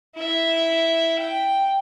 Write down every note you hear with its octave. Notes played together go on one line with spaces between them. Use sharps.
E4 E5
G5